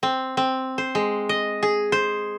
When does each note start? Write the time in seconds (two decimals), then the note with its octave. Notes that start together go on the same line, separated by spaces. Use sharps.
0.03 C4
0.37 C4
0.78 C5
0.95 G#3
1.29 D#5
1.63 G#4
1.92 C5